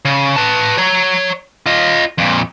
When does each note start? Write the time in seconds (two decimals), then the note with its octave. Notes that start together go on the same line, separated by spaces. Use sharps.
0.05 C#3
0.36 B4 A5
0.78 C#5 A#5
1.66 F4 D#5
2.18 F2 A#2